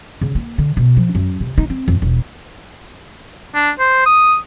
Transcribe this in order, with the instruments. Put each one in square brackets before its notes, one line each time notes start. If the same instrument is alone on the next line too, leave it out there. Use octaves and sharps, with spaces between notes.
[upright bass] C#3
A#3
D3
B2
F3
F#2
C3
D#4
C4
F2
E1
[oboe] D4
C5
D#6